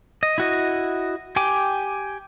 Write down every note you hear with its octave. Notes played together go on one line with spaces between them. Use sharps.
D#5
E4 F#4 D#5
G4 G5 G#5 D6